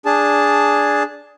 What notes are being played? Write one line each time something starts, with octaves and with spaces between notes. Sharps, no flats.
D4 G#4 A5